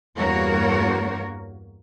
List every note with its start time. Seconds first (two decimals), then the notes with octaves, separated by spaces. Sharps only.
0.17 E2 G2 A#3 F#4 A#4 C#5